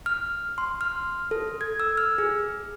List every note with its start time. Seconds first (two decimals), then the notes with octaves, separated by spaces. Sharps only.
0.06 F6
0.58 C6
0.81 F6
1.31 A4
1.61 G#6
1.80 E6
1.97 F6
2.18 G#4